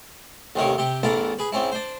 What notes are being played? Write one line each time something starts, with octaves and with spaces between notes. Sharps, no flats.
A1 D#2 C3 D#3 A#4 C#5
C3 G4
A1 E2 B3 D4 A4 A#4
G#4 B4
G#2 C4 C#4 E4
D4 C5